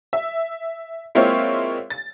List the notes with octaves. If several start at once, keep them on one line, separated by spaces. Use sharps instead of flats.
E5
G#3 A#3 C4 E4 F4 C#5
A6